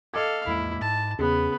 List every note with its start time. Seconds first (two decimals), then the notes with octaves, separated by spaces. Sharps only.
0.14 A4 D#5 F5 D6 G#6
0.47 E2 G#3 A#3 E4
0.81 G#2 A5
1.19 E2 C#3 B3 G#4 B4